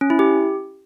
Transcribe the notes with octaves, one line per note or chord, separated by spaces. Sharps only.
C#4
E4
G4